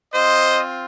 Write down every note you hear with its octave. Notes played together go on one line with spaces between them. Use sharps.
C4 F4 C5 D#5